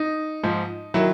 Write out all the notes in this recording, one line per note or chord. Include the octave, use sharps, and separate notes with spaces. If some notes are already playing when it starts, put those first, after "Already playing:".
Already playing: D#4
G#2 F3
D#3 F#3 E4